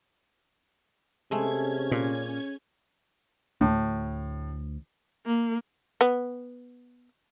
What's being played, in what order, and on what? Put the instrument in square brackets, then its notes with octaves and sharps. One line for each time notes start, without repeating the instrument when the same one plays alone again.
[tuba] C3 [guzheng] G#3 A3 [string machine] C#4 G#6
[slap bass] A#2
[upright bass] D2 [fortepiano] A2
[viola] A#3
[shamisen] B3